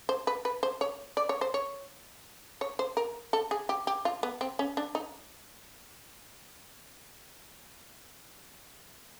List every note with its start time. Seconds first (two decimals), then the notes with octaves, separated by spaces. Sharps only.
0.09 C5
0.27 B4
0.45 B4
0.63 C5
0.81 C#5
1.17 D5
1.29 C#5
1.41 C5
1.54 C#5
2.61 C#5
2.79 C5
2.97 A#4
3.33 A4
3.51 G#4
3.69 G4
3.87 G4
4.05 F4
4.23 B3
4.41 C4
4.59 C#4
4.77 D4
4.95 D#4